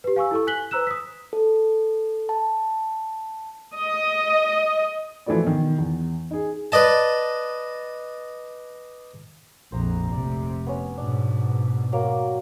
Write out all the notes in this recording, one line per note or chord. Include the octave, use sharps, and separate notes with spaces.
G4 B4
F5 G#5 C#6 E6
E4 A4 C#6
G#5 F#6 B6 F#7 G7
B4 C5 A#5 E6 F#6 E7
D#6 B6
A4
A5
D#5
E3 F3 A3 F#4 D5
B2 D#3
E2
D#4 G#4
B4 D5 D#5 A5
A#1 F2 C5 A#5
F1 C3 D5
B3 C#4
G#2 B2 D4
F#3 A#3